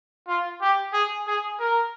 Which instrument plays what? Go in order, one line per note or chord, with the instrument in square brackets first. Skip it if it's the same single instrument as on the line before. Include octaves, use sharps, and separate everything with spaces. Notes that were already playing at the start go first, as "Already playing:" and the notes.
[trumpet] F4
G4
G#4
G#4
A#4